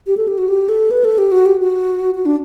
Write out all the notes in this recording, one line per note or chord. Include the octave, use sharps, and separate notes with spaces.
G4
A4
G4
F#4
G4
A4
B4
A4
G4
F#4
G4
F#4
F#4
D4